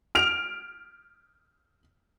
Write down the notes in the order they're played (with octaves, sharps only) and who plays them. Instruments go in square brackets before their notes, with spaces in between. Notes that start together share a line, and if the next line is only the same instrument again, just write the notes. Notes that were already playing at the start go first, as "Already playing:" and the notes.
[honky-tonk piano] F6 D7 F7